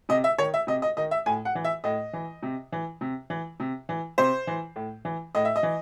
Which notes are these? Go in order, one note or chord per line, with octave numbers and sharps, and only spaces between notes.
C3 D#5
E5
D#3 C#5
E5
C3 D#5
D#5
D#3 D#5
E5
A2 G#5
F#5
E3
E5
A2 D#5
E3
C3
E3
C3
E3
C3
E3
C3 C5
E3
A2
E3
A2 D#5
E5
D#5
E3